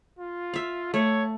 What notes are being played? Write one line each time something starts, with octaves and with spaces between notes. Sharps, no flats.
F4
E5 F5
A3 C#5